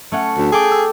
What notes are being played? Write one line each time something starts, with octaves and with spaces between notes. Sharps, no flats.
A3 C#4 F#5
D2
G#4 A4 G5 D6
E6